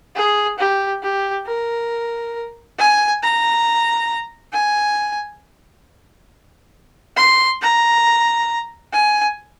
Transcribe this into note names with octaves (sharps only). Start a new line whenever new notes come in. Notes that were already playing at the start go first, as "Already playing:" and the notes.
G#4
G4
G4
A#4
G#5
A#5
G#5
C6
A#5
G#5